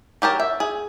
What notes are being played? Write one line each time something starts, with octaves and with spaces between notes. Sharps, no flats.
F#3 G4 A#4 A5
E5
G#4